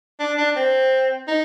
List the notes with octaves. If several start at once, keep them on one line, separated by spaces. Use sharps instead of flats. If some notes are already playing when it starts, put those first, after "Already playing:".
D4
D4
C4
D#4